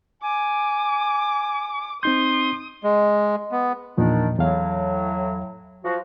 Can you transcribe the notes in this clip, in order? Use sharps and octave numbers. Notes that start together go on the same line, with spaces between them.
G#5 D6
C4 D#4 C6 D#6 G6
G#3
B3
E2 A#2 D#3 F3 D4
E2 A2 F#3 F5
F3 F#4